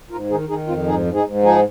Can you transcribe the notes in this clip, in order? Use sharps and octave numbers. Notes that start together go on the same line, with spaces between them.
G#2 F4 A#4
D#3 D#4 G#4
D#3 D#4 G#4
F2 C4 F4
G#2 D#4 G#4
G#2
D#4 G#4
G#2
F3 D#4 G#4